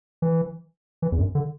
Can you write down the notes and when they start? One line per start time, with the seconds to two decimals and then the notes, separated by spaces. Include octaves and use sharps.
0.22 E3
1.02 E3
1.12 E2
1.19 F#2
1.35 D3